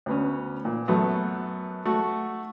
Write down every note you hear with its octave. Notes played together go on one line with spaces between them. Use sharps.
D2 B3 C#4
A#2
F#2 F#3 A3 B3
A3 F#4